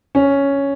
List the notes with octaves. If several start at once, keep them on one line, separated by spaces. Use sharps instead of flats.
C#4